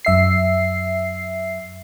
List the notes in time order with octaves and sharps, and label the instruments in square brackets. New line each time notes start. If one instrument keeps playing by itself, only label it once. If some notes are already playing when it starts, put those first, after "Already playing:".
[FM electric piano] F#2 E5 C7